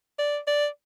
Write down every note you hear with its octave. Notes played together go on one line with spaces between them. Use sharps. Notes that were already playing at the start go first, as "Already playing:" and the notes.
D5
D5